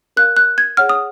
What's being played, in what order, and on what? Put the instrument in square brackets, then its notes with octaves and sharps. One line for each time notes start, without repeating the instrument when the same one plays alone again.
[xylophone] A#4 F5 F#6
F#6
G#6
G#4 C#5 F#5 F6
D#6